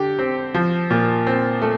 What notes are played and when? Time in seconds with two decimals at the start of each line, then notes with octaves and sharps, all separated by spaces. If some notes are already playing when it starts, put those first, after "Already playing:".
Already playing: D3 G4
0.19 C4
0.54 F3
0.90 A#2
1.27 C4
1.62 A3